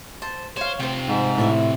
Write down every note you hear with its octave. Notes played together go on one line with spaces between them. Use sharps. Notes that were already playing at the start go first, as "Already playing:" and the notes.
C5 A5
C5 C#5 F5
C3 F4 C5 G5
G#2
A2 D5 E5 C6